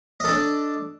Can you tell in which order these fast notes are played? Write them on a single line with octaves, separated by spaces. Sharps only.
D#5 A4 D4